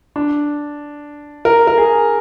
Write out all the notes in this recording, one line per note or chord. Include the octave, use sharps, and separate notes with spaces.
D4
A#4
A#4
G#4